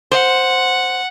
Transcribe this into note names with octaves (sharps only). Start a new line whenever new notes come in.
C5 F#5